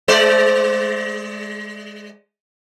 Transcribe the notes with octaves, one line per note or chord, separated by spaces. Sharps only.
G#3 C5 D5